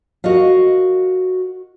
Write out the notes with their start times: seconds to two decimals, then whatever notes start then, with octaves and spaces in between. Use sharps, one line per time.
0.24 F#4 A#4 D#5 F5